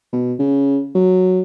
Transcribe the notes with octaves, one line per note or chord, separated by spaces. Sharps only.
B2
C#3
F#3